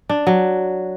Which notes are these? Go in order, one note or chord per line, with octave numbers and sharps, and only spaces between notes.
D4
F#3